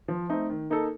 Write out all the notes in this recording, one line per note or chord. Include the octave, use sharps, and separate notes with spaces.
F3
A3 C4 D#4
D#3
A#3 D#4 A4